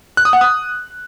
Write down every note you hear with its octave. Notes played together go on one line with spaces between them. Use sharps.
F#6
D#6
F#5
D#6